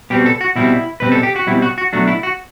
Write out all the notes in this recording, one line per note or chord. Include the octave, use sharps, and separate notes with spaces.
B2 G3 C4 G4
A4
F#4
B2 G3 C4 E4
B2 G3 C4 B4
A4
G4
F#4
B2 G3 C4 E4
F#4
F#4
B2 F#3 A3 D4 F#4
E4
F#4